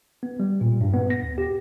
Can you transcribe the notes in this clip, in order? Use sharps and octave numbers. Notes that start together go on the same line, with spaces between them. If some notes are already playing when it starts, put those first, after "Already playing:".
B3
G3
A#2
G2
B3
A#6
D#2
G4